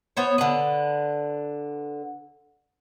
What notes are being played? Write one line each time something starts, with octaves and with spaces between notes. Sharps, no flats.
B3 C5 C#5
D3 B4